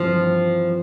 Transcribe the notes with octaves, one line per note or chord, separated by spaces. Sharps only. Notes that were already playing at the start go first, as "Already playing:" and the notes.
Already playing: G2 E3 F3 A3 C4 E4